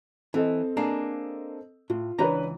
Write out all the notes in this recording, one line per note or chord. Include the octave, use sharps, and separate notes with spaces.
E3 C4 A4 D#5
A#3 D4 G#4
A2 F4
C#2 E3 D4 B4 C#5 A#5